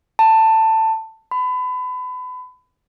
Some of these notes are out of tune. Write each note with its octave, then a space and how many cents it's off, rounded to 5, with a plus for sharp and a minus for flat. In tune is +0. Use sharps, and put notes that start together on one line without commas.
A5 +15
B5 +30